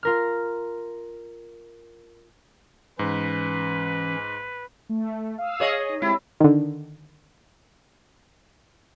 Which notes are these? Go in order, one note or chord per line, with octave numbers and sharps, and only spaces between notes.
F4 A#4 F6
G#2 E3 C#4 B4
A3
F5 D#6 E6
G#4 C#5 D#5
D#4
G#3 C4 E4 G4
D3 D#3